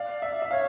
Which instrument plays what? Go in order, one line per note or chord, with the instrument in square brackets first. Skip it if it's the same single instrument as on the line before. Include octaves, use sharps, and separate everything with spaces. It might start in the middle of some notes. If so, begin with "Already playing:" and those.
Already playing: [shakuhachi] D5 [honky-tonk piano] F5
[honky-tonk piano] E5
E5
[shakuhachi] C#5 [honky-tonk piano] F5